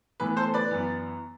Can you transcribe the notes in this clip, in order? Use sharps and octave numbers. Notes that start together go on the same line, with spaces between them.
A2 E3 B3 B4
A4 C5
B4 D5
F#2 E3 B3